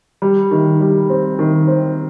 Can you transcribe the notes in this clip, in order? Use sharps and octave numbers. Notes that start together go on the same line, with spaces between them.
G3
D#3
G3
C4
D#3
C4